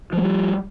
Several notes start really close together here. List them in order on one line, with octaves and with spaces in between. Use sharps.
F3 A3 G3